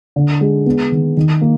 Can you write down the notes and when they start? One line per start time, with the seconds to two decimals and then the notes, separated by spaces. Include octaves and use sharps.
0.16 D3
0.41 G#3
0.66 B3
0.92 D#3
1.17 D#3
1.41 A#3